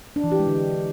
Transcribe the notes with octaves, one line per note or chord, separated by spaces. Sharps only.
D4
E3
G4
G#3
D3